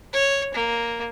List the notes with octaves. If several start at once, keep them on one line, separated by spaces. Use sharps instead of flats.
C#5
A#3